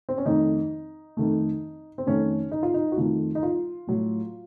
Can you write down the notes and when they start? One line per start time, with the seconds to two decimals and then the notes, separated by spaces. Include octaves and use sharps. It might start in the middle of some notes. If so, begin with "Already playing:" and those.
0.09 C4
0.18 C#4
0.26 F2 D#3 A3 D#4
1.17 F2 D#3 A3
1.98 C4
2.06 F2 D#3 A3 C#4
2.51 D#4
2.63 F4
2.74 D#4
2.92 F#4
2.97 F2 D#3 A3 F4
3.35 D#4
3.43 F4
3.87 A2 F#3 A3